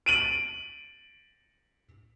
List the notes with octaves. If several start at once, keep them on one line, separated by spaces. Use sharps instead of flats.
D7 D#7 F#7